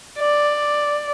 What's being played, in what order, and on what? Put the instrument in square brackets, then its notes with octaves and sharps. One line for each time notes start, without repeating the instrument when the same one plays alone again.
[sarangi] D5